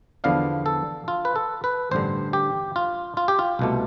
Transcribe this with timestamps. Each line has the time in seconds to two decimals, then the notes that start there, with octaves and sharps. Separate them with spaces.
0.24 E2 D3 F3 B3 D4 F5
0.66 A4
1.08 F4
1.25 B4
1.36 A4
1.64 B4
1.91 A1 G2 D3 C5
2.33 G4
2.76 F4
3.17 F4
3.28 G4
3.39 F4
3.59 C2 B2 A3